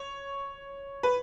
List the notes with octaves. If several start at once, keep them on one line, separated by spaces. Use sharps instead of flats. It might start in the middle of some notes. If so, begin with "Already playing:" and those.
Already playing: C#5
B4